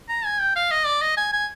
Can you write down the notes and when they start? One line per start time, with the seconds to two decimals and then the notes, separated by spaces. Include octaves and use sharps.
0.09 A#5
0.25 G#5
0.40 G5
0.56 F5
0.71 D#5
0.86 D5
1.02 D#5
1.17 G#5
1.33 G#5